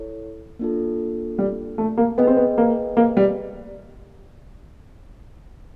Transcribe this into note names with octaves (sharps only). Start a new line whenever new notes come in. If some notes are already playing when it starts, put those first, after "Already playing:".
Already playing: E4 A4 C#5
A#3 D4 F4 A4
G3
A3
A#3
B3 G#4 B4 D#5 G5
C4
B3
A#3
A#3
G3